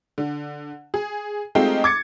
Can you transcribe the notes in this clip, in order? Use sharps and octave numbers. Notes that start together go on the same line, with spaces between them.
D3
G#4
G#3 A3 C4 D#4 F4 G4
D6 G#6 A6 C#7